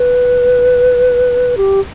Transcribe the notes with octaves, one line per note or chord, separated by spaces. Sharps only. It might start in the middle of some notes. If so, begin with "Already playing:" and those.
Already playing: B4
G4